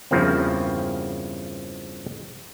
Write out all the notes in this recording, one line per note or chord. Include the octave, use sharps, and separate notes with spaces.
E2 G2 C#3 F3 A#3 C4